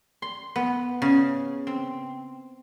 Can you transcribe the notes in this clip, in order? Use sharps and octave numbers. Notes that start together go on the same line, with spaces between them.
C6
B3
C#3
C4